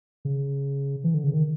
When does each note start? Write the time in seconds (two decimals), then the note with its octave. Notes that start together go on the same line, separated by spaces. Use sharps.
0.25 C#3
1.04 E3
1.14 D3
1.24 C#3
1.34 D#3